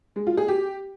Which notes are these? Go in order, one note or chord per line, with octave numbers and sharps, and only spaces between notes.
G#3
F4
G#4
G4